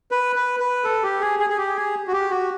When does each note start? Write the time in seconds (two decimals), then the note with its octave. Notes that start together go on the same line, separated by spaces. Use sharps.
0.11 B4
0.36 B4
0.60 B4
0.84 A4
1.03 G4
1.21 G#4
1.39 G#4
1.50 G#4
1.58 G4
1.76 G#4
2.07 F#4
2.12 G4
2.31 F#4